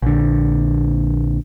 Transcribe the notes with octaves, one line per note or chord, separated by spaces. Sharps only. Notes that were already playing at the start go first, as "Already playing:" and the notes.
A#1 D3